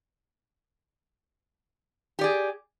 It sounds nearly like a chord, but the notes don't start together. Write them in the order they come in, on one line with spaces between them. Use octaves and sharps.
G4 D5 G#4